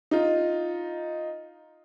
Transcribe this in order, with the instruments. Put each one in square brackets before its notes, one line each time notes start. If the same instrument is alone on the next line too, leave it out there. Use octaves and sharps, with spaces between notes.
[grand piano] D#4 F4